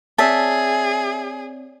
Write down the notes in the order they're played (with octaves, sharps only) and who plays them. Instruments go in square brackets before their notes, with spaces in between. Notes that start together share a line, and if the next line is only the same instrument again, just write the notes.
[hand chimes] C4 C#5 D5 [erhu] G#4 [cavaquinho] E5 A5